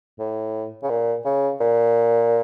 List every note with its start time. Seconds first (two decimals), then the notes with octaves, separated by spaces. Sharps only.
0.19 A2
0.83 C#3
0.90 A#2
1.25 C#3
1.60 A#2